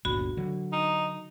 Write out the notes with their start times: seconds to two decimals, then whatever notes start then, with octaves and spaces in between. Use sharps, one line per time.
0.05 G1 D2 A#2 F#4 B5
0.37 D3 F#3
0.73 D#4